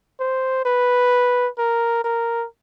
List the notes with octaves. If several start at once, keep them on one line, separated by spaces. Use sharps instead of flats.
C5
B4
A#4
A#4